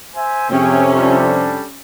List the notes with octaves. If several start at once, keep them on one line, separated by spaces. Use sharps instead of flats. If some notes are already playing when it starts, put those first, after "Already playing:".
C5 E5 G#5
F2 C3 C#4 G#4 E5 G5
G3 D4 A4